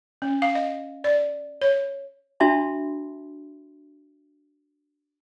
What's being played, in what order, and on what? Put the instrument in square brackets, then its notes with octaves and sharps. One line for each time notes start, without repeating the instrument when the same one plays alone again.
[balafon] C#4
F5
D#5
D5
C#5
[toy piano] D4 F#4 E5 A5 B5 C6